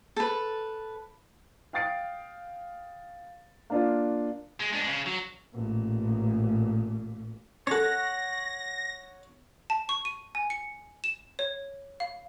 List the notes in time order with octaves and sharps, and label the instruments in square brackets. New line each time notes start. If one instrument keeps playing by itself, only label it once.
[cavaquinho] A4 B4
[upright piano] F5 G5 D#6 A6 C7 D7
A#3 D4 F4
[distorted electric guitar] G#3
G#3 D4
C#3
F#3
[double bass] A1 A#2
[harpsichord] C#4 A4 [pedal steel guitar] C#5 F#5 [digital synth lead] A#6
[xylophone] A5
C#6
D#7
G#5
C#7
E7
C#5
F5